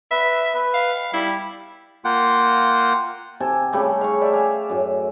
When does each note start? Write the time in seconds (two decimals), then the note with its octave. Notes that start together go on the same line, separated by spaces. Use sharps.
0.11 B4 E5
0.54 B4
0.74 F5
1.13 G3 E4
2.05 A#3 F4 F#5 G5
3.40 C3 A4 G#5
3.73 C#3 G3 A3
4.01 F5 C#6
4.21 G4 D5 E5
4.33 E5 F5 G#5
4.69 F#2 A2